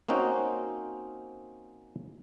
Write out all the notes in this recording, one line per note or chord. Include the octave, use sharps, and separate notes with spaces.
A#3 C4 C#4 D#4 F#4 C5